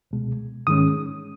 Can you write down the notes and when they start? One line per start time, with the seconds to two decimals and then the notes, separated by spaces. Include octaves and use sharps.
0.11 C#2 B2 G#3
0.67 G#2 D#3 G#3 C#4 D#6